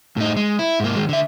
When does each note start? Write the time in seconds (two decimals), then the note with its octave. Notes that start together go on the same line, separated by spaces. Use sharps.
0.17 A2 D#4
0.37 G#3
0.59 E4
0.80 G#2 A#3
0.96 D#3 G#3
1.09 D3 E5